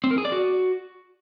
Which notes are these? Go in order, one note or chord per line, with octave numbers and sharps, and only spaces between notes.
C4
A#4
G#4
D5
F#4